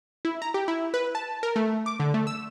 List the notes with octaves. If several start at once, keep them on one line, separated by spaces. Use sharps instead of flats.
E4
A#5
G4
E4
B4
A5
A#4
A3
D6
D3
A3
E6